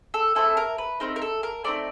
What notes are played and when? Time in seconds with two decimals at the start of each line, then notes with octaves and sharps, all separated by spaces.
0.14 A4
0.35 A3 C4 E4 A4
0.57 A#4
0.78 B4
1.00 A3 C4 D#4 A#4
1.16 A#4
1.22 A4
1.43 A#4
1.64 A3 C4 D#4 D5